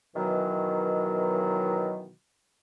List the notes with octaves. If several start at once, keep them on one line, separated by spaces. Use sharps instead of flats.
B2 D#3 E3 F#3